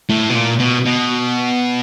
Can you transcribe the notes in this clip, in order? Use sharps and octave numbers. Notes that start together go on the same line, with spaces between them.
A2
B2
A#2
B2
B2